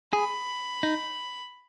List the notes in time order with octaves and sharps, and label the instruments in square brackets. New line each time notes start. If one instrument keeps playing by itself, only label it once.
[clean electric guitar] G#4 [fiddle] B5
[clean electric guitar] D#4